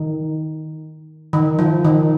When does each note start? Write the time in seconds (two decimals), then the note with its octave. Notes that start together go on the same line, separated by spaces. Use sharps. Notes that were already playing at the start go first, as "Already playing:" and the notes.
Already playing: D#3
1.33 D#3
1.59 F3
1.85 D#3